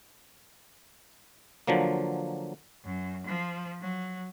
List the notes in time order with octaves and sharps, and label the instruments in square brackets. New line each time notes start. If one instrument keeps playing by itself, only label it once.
[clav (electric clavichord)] D3 F3 F#3 A#3
[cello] F#2
F3
F#3